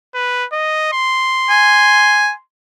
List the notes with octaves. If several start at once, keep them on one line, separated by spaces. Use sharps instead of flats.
B4
D#5
C6
G#5